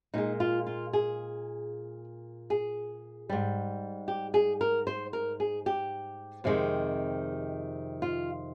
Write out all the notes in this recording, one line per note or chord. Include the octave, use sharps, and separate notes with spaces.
A#2 G#3 D#4
F4
F4
G#4
G#4
G#2 G3
G4
G#4
A#4
C5
A#4
G#4
G4
F2 C3 D#3 G#3
F4